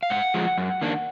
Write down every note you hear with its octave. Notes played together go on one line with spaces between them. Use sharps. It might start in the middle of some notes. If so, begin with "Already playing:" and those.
F5
G#2 F#5
F3 G#3
F#2
D#3 A#3 D4